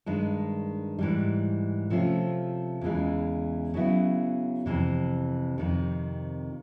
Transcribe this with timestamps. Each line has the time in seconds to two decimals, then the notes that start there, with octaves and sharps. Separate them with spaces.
0.06 G2 D#3 G#3
0.99 G#2 E3 G3
1.90 C3 F3 A3 C#4 F4
2.81 E2 C#3 E3 G#3
3.74 C#3 F#3 B3 E4
4.66 F2 C3 E3
5.58 F2 C3 D#3